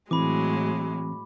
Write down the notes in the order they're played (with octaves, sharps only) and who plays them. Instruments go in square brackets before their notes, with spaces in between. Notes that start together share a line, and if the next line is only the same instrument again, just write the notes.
[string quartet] A2 F#3 G#3 [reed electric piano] E3 C4 [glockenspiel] B5 D6